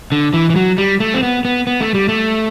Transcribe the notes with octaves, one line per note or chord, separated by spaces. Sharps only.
D3
E3
E3
F#3
G3
A3
C4
B3
B3
B3
A3
G3
A3